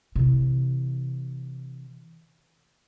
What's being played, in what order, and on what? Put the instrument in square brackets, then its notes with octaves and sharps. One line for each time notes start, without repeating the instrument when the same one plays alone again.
[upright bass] C3 E3